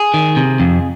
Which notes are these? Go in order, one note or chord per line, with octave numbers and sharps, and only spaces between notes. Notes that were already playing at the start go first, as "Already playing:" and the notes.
Already playing: G#4
D#3
C3
F2